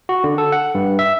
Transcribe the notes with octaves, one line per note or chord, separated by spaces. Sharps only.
F#4
D3
A4
F#5
G2
E5